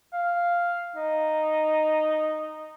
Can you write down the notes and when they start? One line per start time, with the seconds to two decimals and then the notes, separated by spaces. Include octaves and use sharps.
0.13 F5
0.96 D#4